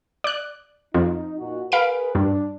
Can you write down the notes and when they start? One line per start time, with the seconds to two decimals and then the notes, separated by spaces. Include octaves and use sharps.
0.24 D5 F#6
0.94 F2 D#4
1.38 A#2 D#4 F#4
1.72 G#4 A#4 B4 F5 B5 D7
2.15 G2 D4